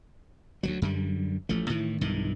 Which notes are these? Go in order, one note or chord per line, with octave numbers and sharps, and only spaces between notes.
D2 F3 F#3
F#2 D3 G3
A1 F3 A3
A2 D#3 E3
B1 G2 D#3 E3